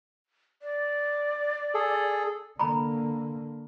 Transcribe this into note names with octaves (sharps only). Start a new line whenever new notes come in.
D5
G#4 A4
D3 A#3 A#5 B5